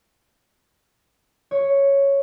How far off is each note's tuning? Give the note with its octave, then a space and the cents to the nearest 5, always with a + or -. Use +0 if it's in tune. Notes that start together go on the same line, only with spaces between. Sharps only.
C#5 +0